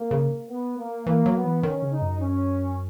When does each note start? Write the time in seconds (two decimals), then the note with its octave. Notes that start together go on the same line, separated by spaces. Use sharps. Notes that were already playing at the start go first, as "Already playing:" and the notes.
Already playing: A#3
0.11 C#3
0.49 B3
0.77 A#3
1.06 E3 A#3
1.26 F#3
1.35 B3
1.44 E3
1.63 D#3 C#4
1.82 C#3
1.91 D#4
2.01 F#2
2.20 C#4